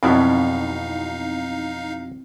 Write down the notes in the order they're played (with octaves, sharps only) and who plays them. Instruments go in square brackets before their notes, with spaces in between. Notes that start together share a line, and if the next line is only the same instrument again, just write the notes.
[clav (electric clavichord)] F2 B2 F#3 [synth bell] C4 E4 F#4 [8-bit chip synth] D#4 F5